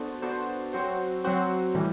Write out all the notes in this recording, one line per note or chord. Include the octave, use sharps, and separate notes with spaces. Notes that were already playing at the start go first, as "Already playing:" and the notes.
Already playing: B3 D4 F#4 A4 C5
B3 D4 F#4 A4 C5
F#3 C4 F#4 C5
F#3 C4 F#4 C5
A2 E3 G3